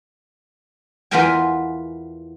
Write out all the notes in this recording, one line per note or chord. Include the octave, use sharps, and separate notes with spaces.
E2 B3 F4 A#4 G5 G#5